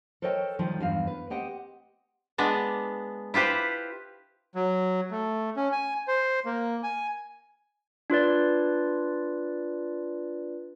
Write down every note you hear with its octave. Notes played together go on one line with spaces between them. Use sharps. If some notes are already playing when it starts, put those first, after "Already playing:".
A4 A#4 C5 C#5 D#5 G5
D#3 F3 G3 D#4
E2 G2 F5
B4
C4 G4 D#5 F#5 G5
G#3 B3 D4
E4 F4 G4 B4 C5
F#3
A3
C#4
G#5
C5
A#3
G#5
D4 F4 B4 D5